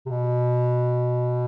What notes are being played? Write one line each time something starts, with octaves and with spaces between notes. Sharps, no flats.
C3
B2